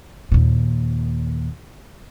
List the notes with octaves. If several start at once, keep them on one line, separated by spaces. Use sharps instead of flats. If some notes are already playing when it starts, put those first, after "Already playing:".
D#2 A#2